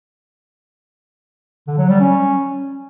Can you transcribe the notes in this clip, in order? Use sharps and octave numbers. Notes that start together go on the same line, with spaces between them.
D3
F#3
G3
C#4